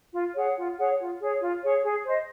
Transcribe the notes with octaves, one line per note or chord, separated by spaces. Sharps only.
F4
G#4 C#5 F#5
F4
G#4 C#5 F#5
F4
G#4 C#5
F4
G#4 C#5
G#4
C5 D#5